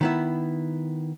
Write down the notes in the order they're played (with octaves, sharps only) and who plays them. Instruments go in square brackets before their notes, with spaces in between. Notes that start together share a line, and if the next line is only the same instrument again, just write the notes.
[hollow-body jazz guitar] D#3 B3 E4